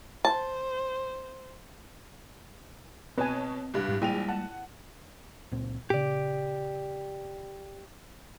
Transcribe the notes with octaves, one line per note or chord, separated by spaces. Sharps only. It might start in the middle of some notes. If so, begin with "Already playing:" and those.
C5 A5
B2 C4 B4 C#5 D#5 G#5 A5
C2 G2
G#2 G3
A#1 G3 G#3 A#3 E4 G5 D#7 F7
F#5 A5
C#2 A#2 C4
A#2 C#3 G4 D5